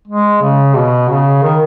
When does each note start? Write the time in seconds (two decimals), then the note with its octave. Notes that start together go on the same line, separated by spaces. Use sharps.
0.07 G#3
0.42 C#3
0.76 B2
1.09 C#3
1.42 D#3